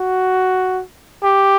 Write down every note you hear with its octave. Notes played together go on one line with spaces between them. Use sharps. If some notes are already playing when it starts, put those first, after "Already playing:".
Already playing: F#4
G4